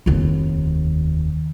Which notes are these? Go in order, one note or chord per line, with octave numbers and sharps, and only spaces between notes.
F1 D#2